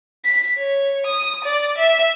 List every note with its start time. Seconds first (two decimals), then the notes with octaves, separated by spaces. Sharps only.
0.25 B6
0.58 C#5
1.06 D#6
1.44 D5
1.78 E5